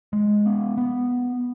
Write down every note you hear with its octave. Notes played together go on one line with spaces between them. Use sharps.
G#3
B3
B3